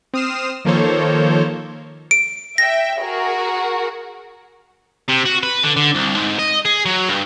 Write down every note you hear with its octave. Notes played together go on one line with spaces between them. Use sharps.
C4 D#6 F6 C7 E7
D#3 F3 A#3 A4 C5 C#5
D7
E5 G5 A#6
F#4 G#4 A#4
C3
F#4
B4
D3
D3
C2
G#2
D#5
G#4
F#3
G2